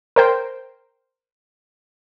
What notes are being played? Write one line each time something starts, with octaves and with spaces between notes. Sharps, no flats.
A#4 C5 G5